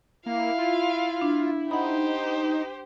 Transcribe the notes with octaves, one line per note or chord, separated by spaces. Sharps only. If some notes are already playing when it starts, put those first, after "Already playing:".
A#3 E4 F5
F4
D4
D#4 G4 C5 F#5 B5